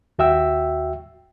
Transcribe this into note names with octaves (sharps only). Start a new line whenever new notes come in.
D#2 F#4 E5 G5 E6